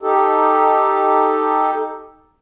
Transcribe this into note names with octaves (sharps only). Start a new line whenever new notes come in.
D#4 G4 A4